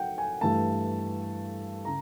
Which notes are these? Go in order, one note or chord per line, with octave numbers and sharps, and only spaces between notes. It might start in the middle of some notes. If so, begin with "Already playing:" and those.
Already playing: F#3 F#5 G5
G#5
G2 E3 A3 A5
C#3 A#5